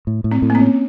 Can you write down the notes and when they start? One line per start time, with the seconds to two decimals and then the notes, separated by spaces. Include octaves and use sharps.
0.07 A2
0.24 A2
0.31 C4
0.42 A2
0.50 A#3
0.55 C4
0.61 C#4